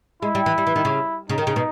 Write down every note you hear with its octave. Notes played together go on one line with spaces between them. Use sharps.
G#3 E4
G3
E3
G3
E3
D#3
C#3
C#3 D#4
D#3
C#3
B2